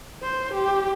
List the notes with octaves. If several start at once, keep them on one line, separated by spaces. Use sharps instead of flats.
C5
G4